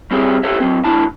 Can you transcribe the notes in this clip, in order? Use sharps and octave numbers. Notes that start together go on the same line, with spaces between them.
G3 C4 G4 G#4 C#5 E5
G4 A4 C5 C#5 E5
F#3 C4
E2 A2 D4 E4 A5